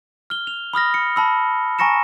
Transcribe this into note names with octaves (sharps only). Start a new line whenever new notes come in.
F6 G7
F7
B5 D#6 F6 A#6
C#7
A5 B5 E6
G#5 A#5 C#6 A#6 C#7 E7